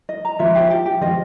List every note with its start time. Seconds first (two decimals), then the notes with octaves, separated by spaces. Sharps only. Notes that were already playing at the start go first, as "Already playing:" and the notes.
0.09 D#5
0.25 A#5
0.39 F3 F4 E5
0.55 G4
0.70 G4
0.86 G4
1.01 F3 F4 D#5